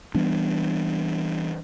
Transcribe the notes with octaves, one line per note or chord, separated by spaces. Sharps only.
E3 G3 B3 D4